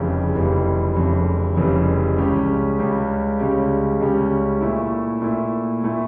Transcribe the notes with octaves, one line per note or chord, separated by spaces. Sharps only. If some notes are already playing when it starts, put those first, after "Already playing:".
Already playing: F1 F2 C#3 E3 G3
F1 F2 C#3 E3 G3
F1 F2 C#3 E3 G3
F1 F2 C#3 E3 G3
C#2 C#3 G3 C#4 G4
C#2 C#3 G3 C#4 G4
C#2 C#3 G3 C#4 G4
C#2 C#3 G3 C#4 G4
A#2 A3 E4
A#2 A3 E4
A#2 A3 E4